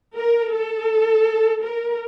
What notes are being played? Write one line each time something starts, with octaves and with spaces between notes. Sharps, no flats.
A#4
A4
A#4